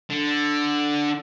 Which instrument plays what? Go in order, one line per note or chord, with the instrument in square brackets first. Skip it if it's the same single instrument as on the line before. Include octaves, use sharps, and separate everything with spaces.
[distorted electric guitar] D3